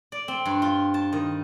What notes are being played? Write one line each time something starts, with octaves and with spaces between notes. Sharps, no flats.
D5
C4
G2
F4
A5
D#3